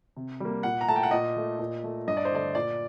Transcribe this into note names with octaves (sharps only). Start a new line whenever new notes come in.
C3
G3 A#3
A#2 F#5
A#5
A3 A5
G5
F#5
A#2 D#5
A3
A#2
A3
G2 D#5
D5
C5
D3 A3 D5
A#2 D5